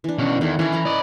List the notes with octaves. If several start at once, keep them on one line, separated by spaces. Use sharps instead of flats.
E3 D4
B2 C#4
E2 D#3 A4 D5
E3 C#4 C#5
E4 B4 A#5
D5 D#5